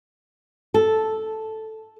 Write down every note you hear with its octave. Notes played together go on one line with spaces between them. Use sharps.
A4